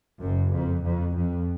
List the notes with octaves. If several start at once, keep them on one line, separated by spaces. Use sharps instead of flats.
F#1 F#2
F2
F2
F2